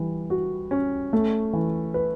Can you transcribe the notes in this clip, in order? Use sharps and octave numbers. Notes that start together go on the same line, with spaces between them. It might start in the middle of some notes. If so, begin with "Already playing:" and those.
Already playing: E3 G3
F#4
C#4
A3
E3
B4